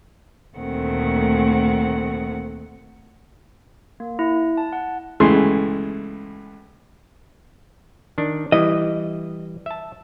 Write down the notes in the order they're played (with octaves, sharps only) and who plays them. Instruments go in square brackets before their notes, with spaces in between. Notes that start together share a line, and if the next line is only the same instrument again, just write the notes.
[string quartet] D2 A#2 D#3 A3 C4 F#5
[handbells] A#3
E4
A5
F#5
[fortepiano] C#2 B2 E3 A3 G#4 C6
[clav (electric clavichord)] D#3 D4
[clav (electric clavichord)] E3 G3 E4 [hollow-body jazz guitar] D#5
[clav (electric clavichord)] E5 A5